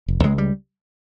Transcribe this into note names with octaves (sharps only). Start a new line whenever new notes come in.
F1
C#2 G#3
G3